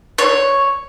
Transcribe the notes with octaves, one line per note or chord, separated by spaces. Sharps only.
C#5